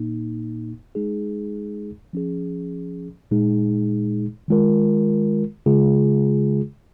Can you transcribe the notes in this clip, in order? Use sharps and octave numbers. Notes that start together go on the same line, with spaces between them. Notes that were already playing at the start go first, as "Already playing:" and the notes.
Already playing: A#2 A#3 D#4
G#3 D#4 G#4
F3 C#4 G#4
A#2 G#3 D#4 G#4
D#3 G#3 F4 A#4
C#3 G#3 F4 G#4